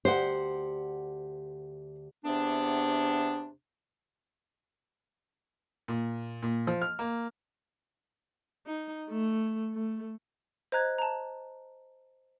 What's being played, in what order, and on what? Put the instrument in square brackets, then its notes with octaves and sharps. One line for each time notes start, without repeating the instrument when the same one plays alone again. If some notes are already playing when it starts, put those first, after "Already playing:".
[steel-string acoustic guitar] D2 G4 F#5 [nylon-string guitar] C5
[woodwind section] E2 C3 B3 D4
[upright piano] A#2
A#2
F3
F6
A#3
[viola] D#4
A3
A3
[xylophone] C5 D#5 A#5 F#6 G#6
A5 A#5